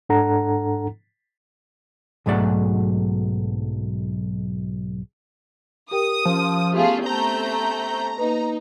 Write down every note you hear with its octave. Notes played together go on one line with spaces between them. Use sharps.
G#2 D4 A4 F#5 A#5
B1 G#2 F#3 A3 D5 F#5
G4 A#4 G5 D#6
F3 C#4
A3 B3 F4 G4 G#4
A3 C4 A#5 G6
A#3 D#4 B4